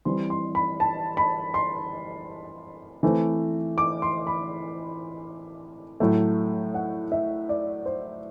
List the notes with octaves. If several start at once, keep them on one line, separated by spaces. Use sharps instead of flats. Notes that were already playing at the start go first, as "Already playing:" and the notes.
E3 G3 C4 C6
C6
B5
A5
B5
C6
E3 A3 C4
D6
C6
B5
A2 F#3 A3
F#5
E5
D5
C5